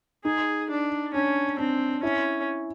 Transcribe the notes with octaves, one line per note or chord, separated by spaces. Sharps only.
D#4 G#4
D4
C#4 D4
C4 D4
C#4 E4